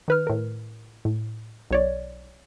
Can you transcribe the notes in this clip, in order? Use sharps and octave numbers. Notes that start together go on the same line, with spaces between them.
D#3 B4 F6
A2 A#4
A2
B1 C#5 D5